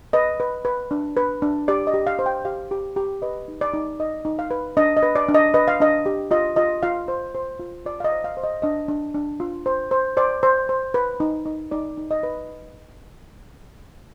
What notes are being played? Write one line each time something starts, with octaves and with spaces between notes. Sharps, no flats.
B4 D#5
B4
B4
D4
B4
D4
G4 D5
D#5
G4
F5
C5
G5
G4 F5
G4
G4
B4 D#5
D#4
D5
D#4
D#4 D#5
D#4
F5
B4
D4 D#5
D#5
B4
D5
D4
D#5
B4 D#5
F5
D4 D#5
G4
F4 D#5
F4 D#5
F4 F5
C5
C5
F4
F4 D5
F5
D#5
C5
F5
C5
D#5
D4 D#5
D4
D4
F4
C5
C5
C5 D5
C5
C5
B4
D#4
D#4
D#4 D5
D#4
D#5
B4